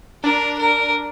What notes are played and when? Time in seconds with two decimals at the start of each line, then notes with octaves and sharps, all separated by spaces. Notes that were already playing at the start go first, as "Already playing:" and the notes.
0.23 D4 A#4
0.59 A#4